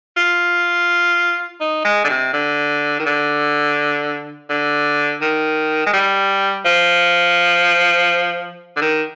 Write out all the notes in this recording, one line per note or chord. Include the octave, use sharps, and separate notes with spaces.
F4
D#4
G#3
D3
C3
D3
D#3
D3
D3
D#3
G#3
G3
F3
D3
D#3